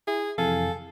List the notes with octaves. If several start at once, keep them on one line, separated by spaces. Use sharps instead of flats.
E4 G#4
F2 C3 E3 A4 F5 G#5